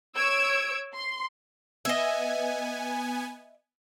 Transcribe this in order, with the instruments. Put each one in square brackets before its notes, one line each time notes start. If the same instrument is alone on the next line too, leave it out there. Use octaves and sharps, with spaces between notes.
[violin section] C#5 E6 G#6 D7
C6
[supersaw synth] B3 G#5 [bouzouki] D#5 E5